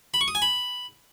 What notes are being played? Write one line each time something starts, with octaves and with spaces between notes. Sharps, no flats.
B5
C#6
D#6
G#5
B5